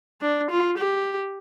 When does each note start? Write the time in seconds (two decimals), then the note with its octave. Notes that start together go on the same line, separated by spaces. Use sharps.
0.21 D4
0.51 F4
0.78 G4